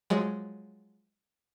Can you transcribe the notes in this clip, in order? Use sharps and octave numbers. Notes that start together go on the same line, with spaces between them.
F3 F#3 G#3